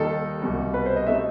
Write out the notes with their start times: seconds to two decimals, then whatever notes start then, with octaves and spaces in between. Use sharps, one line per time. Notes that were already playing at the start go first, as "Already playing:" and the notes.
Already playing: D#2 D#3 G3 D#4 A4
0.42 C2 B2 G3
0.74 B4
0.86 C5
0.96 D#5
1.07 B2 A3 D#4 E5